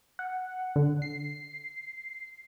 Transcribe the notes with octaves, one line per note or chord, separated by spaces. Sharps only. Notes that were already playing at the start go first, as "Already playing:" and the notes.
F#5
D3
C7